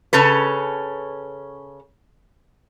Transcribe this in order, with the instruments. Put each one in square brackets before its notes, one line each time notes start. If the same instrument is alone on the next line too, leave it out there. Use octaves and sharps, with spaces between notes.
[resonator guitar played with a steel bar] C#3 C#4 A4 B4